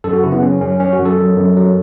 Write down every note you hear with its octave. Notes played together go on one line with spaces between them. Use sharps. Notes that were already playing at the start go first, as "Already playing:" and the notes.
F#2 A4
F#4
C#3 E4
B3
F#2 C#4
F#2 C#4
F#2 C#4
F#4
F#2
A4
F#3
F#2
F#3